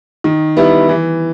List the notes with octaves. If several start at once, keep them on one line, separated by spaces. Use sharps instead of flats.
D#3
G3 B3 E4
E3